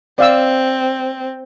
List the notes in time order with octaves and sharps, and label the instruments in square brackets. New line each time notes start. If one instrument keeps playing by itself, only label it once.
[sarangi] C4 [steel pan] D5 F5 E6